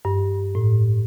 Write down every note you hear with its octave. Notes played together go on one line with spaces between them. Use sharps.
G2
A2